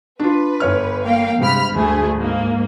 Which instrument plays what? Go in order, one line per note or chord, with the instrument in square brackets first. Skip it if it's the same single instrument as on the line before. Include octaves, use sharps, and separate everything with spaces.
[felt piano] D4 F4 [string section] B4
[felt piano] G1 C#5 F6
[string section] A#3 F5 G5
[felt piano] G2 G#3 [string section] C3 B5 F6
[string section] D2 A3 G#4
G#2 A#3